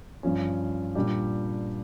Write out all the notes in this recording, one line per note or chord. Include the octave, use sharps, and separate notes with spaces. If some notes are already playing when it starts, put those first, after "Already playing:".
G2 F3 C#4
A#2 G3 D4 G4